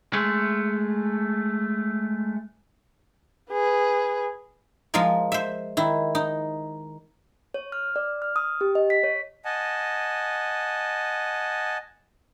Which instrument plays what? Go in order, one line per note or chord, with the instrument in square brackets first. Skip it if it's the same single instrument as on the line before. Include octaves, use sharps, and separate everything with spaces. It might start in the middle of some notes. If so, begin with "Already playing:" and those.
[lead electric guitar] G#3 A3
[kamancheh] G#4 B4
[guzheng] F3 G#3 F4 A#4 G#5
C5 E5
D#3 E4
D#4
[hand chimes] C#5
F6
D5
F6
D#6
G4
D#5
B6
C#5
[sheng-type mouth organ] D#5 F#5 G#5 A5